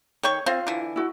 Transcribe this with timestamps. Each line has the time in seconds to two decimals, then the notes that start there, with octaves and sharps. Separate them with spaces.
0.23 D#3 C#5 G5 C#6
0.46 C4 F4 F5
0.67 D3 E3
0.96 E4 F#4